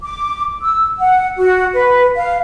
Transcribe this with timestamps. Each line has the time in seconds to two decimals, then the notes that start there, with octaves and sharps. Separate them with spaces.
0.03 D6
0.62 E6
1.00 F#5
1.38 F#4
1.73 B4
2.17 F5